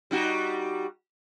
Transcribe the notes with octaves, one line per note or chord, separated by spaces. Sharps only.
G3 D#4 F#4